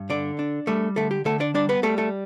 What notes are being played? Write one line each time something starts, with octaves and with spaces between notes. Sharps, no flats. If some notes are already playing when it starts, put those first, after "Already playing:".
Already playing: G2
D3 D4 D5
D4
G3 A3 A4
D3 A3 A4
G4
D3 A3 A4
D4 D5
G3 D4 D5
B3 B4
G3 A3 A4
A3 A4